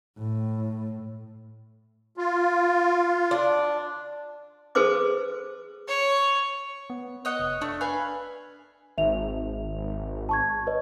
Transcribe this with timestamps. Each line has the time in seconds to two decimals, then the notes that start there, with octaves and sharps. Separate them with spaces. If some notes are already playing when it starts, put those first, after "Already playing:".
0.18 A2
2.17 F4
3.31 D4
4.75 G#4 A4 B4 C5 C6 D6
5.88 C#5
6.90 B3
7.25 C#5 D#5 F#5
7.40 F1
7.61 A3 D4
7.81 B4 F5 G#5
8.98 G#1 E5 F7
10.29 A5 C#6 G#6
10.67 B4 C#5 D#5